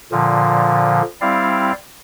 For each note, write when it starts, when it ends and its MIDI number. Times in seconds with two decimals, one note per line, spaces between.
0.12 1.02 46
0.12 1.02 50
0.12 1.02 53
1.21 1.72 55
1.21 1.72 60
1.21 1.72 64
1.21 1.72 74
1.21 1.72 77